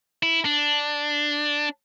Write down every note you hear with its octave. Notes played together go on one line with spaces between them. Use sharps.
E4
D4